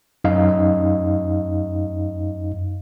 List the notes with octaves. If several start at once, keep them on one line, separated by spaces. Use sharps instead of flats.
F#2 D#4 D#5 F5